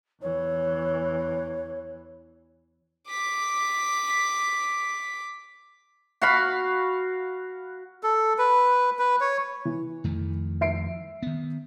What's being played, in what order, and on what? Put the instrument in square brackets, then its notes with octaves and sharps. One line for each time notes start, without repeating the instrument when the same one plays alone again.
[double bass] E2 E3 [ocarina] C#5
[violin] D6 B6
[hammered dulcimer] F#4 F5 B5
[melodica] A4
B4
B4
C#5
[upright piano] E3
[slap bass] F2 D#3 A3
[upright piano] E5 C7 D7
[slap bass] D#3 B3